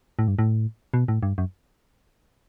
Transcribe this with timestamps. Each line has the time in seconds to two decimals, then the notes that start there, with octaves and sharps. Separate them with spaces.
0.19 A2
0.28 G2
0.39 A2
0.94 B2
1.08 A2
1.23 G2
1.38 F#2